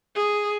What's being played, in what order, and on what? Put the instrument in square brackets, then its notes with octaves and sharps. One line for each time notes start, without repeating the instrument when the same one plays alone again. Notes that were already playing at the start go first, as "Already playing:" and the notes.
[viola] G#4